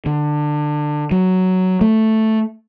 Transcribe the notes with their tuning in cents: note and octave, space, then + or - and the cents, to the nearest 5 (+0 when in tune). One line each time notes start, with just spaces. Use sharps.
D3 +20
F#3 +5
A3 +0